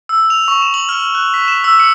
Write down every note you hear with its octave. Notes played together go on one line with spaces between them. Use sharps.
E6
F7
C#6
E7
F#7
F6
F#6
B6
E7
E6
C#7